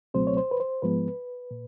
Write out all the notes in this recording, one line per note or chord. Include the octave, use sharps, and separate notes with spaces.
C#2 B2 F#3 A3 C4 C5
C#5
C5
B4
C5
G#2 F3 G#3 B3 B4
A#2